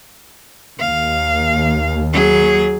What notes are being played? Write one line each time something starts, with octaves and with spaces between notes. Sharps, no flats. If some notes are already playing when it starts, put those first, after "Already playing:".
D#2 F5
F#3 G#4